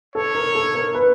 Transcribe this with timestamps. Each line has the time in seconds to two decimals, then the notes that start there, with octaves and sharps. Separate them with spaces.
0.15 A4 C#5
0.35 A#4
0.55 A4
0.75 A#4
0.95 B4